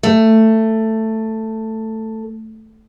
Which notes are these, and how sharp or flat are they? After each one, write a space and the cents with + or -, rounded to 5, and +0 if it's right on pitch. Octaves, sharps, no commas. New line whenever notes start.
A3 +10